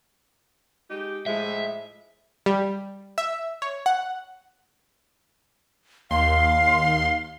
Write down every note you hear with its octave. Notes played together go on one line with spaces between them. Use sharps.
G#3 D#4 G4
A2 F3 G#3 E5
G3
E5
C#5
F#5
D#2 F5 C6